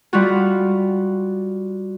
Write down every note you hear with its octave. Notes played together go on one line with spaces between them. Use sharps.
G3 F4 F#4